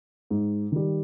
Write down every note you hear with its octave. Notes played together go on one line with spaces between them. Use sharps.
G#2
D#3 G3